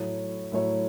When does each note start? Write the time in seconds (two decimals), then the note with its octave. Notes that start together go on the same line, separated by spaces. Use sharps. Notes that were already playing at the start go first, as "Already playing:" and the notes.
Already playing: A2 F#3 A3 E4 C#5
0.52 A2 F#3 A3 E4 C#5